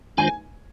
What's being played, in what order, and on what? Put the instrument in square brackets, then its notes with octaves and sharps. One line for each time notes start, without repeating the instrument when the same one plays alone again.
[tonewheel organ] D#3 G#3 D4 F4 C5 [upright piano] G#5